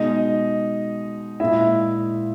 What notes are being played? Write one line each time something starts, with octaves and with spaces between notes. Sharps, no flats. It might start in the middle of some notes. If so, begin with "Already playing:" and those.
Already playing: B2 G#3 D#4 D#5
A#2 G#3 E4 E5